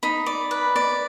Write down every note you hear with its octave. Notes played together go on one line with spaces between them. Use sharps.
D#4 B5
D5
B4
D5